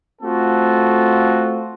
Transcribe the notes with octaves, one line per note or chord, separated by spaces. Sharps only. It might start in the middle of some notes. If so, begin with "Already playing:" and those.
A3 C4 F4 F#4 A4